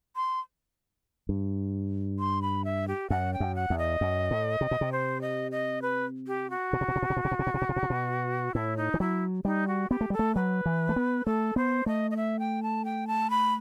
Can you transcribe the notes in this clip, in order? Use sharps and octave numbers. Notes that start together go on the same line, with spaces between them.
C6
G2
C6
B5
E5
G4
F#2 F#5
G5
F#2
F#5
E2
D#5
F#2
A2
C3
B2
C3
C5
D#5
D#5
B4
G4
F#4
B2
C3
B2
C3
B2
C3
B2
C3
B2
C3
B2
C3
B2
C3
B2
C3
B2
A2 E4
D#4
E3
F#3 E4
G3 D#4
F#4
B3 G4
A3
G3 A4
A3
F#3 B4
E3
A3
B3
A3 A4
B3 C5
A3 D#5
D#5
E5
G5
A5
G5
A5
B5